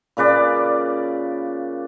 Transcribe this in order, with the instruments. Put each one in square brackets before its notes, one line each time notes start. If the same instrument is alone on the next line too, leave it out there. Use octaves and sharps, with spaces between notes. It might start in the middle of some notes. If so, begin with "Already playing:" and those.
[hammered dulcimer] A#2 C#3 B4 D5